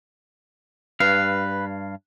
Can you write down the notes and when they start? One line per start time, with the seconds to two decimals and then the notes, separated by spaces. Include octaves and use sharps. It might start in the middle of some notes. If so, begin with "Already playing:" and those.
1.00 G2 B4 F5